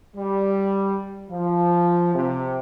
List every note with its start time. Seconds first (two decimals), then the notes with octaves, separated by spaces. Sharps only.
0.16 G3
1.31 F3
2.15 C3